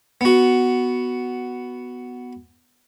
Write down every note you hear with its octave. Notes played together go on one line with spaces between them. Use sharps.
B3 F#4